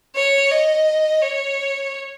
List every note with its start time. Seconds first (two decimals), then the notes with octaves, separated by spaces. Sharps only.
0.15 C#5
0.51 D#5
1.22 C#5